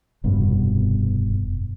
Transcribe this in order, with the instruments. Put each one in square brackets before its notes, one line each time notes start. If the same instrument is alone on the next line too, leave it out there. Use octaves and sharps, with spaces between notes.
[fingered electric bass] F1 G2 B2